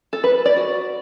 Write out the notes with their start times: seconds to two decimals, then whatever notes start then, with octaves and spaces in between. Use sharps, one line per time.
0.13 A4
0.24 B4
0.35 B4
0.46 D5
0.56 F#4